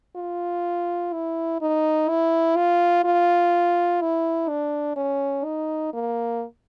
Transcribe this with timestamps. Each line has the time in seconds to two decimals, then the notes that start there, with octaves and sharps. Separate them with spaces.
0.16 F4
1.13 E4
1.61 D#4
2.09 E4
2.56 F4
3.04 F4
4.01 E4
4.49 D4
4.96 C#4
5.45 D#4
5.94 A#3